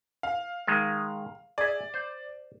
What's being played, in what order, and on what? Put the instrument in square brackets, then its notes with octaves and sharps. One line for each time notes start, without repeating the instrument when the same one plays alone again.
[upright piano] F5
[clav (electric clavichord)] D#3 G#3
[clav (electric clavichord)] G#4 E5 [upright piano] D5
[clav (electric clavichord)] C5